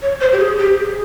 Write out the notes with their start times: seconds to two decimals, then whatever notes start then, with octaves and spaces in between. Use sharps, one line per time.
0.02 C#5
0.21 C5
0.32 G4
0.39 G#4
0.59 G4
0.77 G#4